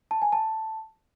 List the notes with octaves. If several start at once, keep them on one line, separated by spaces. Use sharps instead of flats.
A5
G#5
A5